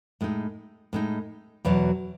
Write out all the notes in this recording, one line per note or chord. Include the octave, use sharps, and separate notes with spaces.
A2 G#3 D#4
A2 G#3 D#4
E2 B2 F#3 B3